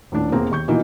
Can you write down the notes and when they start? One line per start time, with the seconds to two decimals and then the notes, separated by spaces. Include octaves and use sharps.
0.12 D#1 A2 D4
0.32 E1 A1 A#3 C4 G#4 A#5
0.52 D#2 C#6 G6
0.68 B2 E3 F3 A#3 D#4